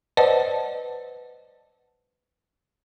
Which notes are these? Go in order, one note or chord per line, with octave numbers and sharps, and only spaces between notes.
B4 C5 D5 D#5 F#5 A5